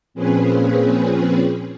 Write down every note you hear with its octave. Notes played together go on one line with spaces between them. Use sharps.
A#2 F3 C4 C#4 G#4 B4